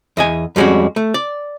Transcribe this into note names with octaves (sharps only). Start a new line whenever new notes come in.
E2 D#5 G#5
F2 G3 G#3 C#4 F#4
A3
D5